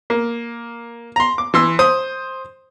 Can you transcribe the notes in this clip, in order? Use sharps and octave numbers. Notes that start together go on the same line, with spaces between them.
A#3
A#5 C6
D6
E3 C6 E6
C5 D#6